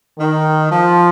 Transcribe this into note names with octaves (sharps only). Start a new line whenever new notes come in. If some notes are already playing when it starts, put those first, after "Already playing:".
D#3
F3